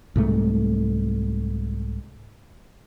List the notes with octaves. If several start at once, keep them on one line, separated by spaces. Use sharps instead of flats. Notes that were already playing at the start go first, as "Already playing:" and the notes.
C2 G#2 A3